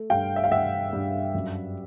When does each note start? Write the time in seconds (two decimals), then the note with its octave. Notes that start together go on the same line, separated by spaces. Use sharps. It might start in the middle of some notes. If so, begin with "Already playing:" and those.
Already playing: A3
0.10 G2 F5 G5
0.36 E5
0.44 F5
0.52 G2 E5 F#5
0.93 G2
1.34 F#2